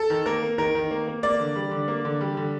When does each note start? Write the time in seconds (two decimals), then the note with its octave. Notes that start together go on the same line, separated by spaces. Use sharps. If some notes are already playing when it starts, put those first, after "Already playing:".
Already playing: A4
0.10 D#3
0.26 A#3 A#4
0.42 A#3
0.58 D#3 A#4
0.75 D#3
0.91 A#3
1.07 A#3
1.23 A#3 D5
1.39 D3
1.56 G3
1.71 D3
1.88 A#3
2.05 D3
2.21 G3
2.37 D3